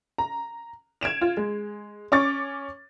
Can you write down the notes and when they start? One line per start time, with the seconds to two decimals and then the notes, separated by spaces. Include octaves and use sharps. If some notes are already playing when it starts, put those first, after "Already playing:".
0.18 A#5
1.01 G#6 D7 E7 F7
1.21 F4
1.37 G#3
2.12 C#4 C#6 D6 A6